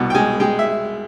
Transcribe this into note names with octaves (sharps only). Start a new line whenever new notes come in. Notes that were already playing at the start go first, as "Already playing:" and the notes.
Already playing: C2 B2 F#5
G5
G#3 G#5
G#3 G5
E5